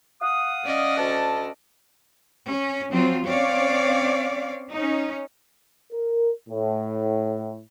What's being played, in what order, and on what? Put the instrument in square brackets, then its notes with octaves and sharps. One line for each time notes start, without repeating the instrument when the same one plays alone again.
[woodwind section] F5 F#5 D#6
[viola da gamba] C#4 D5 D#5
[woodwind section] D2 A5
[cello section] C#4
F3 F#3 C4 F4
C4 C#4 C#5 D5 F5
C#4 D#4
[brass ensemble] A#4
A2